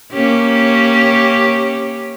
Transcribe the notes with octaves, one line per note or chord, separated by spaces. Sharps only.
A#3 C#4 G4